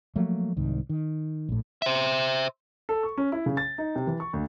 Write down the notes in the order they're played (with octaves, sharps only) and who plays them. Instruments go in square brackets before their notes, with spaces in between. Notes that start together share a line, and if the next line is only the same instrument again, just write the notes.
[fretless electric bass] F3 F#3 A3 A#3
C2 G#2 D#3
D#3
A#1 A2
[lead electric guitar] C5 E5
[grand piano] A4
C#6
C#4
E4
C#3
A6
D#4
C3
E3
C#6
D2